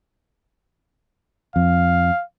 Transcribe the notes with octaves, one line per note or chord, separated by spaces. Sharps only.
F2 F5